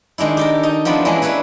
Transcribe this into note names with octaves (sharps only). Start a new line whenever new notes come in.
D#3 G#3 D4 E4
G4 A4 A#4
D#4
F3 B3 C4 D4 E4
E3 G#3 A#3 C#4 D4 E4
D4 E4 B4 C#5 E5